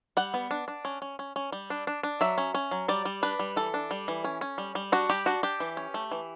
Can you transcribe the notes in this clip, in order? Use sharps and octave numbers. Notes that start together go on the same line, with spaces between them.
G3 F#5
B3
D4
D4
C#4
C#4
C#4
C#4
G3
D4
D4
D4
F#3 E5
C#4
C#4
F#3
G3 D5
G3
D4 B4
G3
E3 A4
D4
G3
E3
C#4
C#4
G3
G3
D4 F#4
G3 G4
D4 F#4
D4 G4
E3
C#4
A3
E3